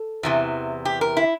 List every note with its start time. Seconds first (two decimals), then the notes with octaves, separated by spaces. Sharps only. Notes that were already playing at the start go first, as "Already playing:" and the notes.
Already playing: A4
0.23 E2 C3 E3
0.85 G4
1.01 A#4
1.17 E4